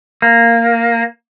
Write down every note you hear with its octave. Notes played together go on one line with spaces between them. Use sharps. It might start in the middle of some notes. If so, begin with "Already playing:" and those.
A#3